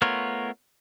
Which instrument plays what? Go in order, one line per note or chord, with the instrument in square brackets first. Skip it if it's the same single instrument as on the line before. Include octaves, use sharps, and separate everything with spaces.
[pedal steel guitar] A3 B3 F4 A#4 C#5